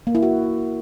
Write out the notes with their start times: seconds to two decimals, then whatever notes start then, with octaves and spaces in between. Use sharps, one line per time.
0.07 A#3
0.15 E4
0.23 F#4